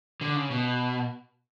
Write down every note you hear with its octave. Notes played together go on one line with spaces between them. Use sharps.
D3
C#3
B2